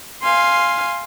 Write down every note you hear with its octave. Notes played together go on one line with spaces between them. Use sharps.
F5 G#5 C6